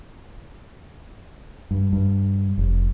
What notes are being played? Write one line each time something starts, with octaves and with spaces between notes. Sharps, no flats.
G2
G2
F1